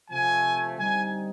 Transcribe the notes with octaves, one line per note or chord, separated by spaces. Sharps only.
C3 F3 A3 G#5
D3 G3 C4 D#4 G#5